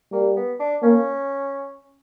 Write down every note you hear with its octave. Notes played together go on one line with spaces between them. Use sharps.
G3 A#3
B3
D4
A#3 C#4